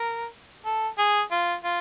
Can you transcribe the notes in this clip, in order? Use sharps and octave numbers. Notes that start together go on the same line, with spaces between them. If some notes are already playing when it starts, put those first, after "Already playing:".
Already playing: A#4
A4
G#4
F4
F4